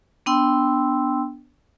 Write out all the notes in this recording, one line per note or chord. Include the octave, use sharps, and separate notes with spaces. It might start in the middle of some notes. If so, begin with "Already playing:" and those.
B3 D4 G5 C6 E6